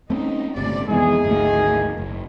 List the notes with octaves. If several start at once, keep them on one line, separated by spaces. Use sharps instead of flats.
A3 C4 C#4 D#4
G1 C#2 A2 C3 D5
C2 F2 E3 G#3 B3 D#4 E4 G#4
G#1 D2 D#3 A3 A#3
F#1